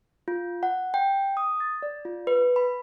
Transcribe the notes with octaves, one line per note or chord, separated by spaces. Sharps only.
F4
F#5
G5
D#6
A6
D5
F4
B4
B5